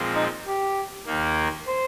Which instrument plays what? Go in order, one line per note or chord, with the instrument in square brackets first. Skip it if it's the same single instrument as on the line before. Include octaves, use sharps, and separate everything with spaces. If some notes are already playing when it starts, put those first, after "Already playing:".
Already playing: [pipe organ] A#2 F3 G#3 C4
[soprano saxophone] D#4
G4
[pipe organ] D#2 D#3 A#3
[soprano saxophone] C5